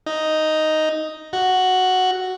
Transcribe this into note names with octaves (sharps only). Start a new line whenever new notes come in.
D#4
F#4